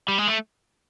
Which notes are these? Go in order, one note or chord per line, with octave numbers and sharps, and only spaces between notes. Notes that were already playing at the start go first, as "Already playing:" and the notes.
G3
G#3
A3